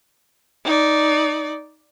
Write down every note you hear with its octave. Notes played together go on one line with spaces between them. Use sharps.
D#4 D5